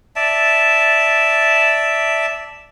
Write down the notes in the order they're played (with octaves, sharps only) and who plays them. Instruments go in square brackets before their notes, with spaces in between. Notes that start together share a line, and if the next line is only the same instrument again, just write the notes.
[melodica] D5 E5 A5